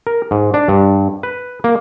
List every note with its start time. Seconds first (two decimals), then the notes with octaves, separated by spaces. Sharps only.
0.07 A#4
0.31 G#2
0.54 D4
0.68 G2
1.23 B4
1.64 A#3